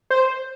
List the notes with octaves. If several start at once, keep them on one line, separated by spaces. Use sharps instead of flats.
C5